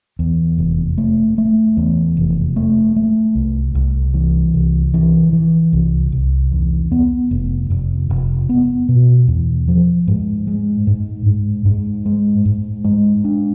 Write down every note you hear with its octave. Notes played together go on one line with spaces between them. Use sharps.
E2
F1
A3
A3
E2
F1
A3
A3
C2
C2
E3
C2
E3
E3
C2
C2
E2
B3
F1
F1
F1
B3
B2
E2
F3
G#2
G#3
G#2
G#2
G#2
G#3
G#2
G#3
D4